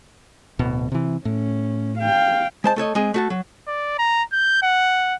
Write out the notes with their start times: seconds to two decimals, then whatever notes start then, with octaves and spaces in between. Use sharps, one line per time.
0.59 D1 B2
0.92 C3 E3
1.25 A2 C#4
1.98 F5 G5
2.64 G#3 C5 A5
2.76 A3 A4 C#5 D#5
2.95 G#3 C4 G#4
3.14 A3 F#4 A4
3.30 F#3
3.67 D5
3.99 A#5
4.32 G6
4.63 F#5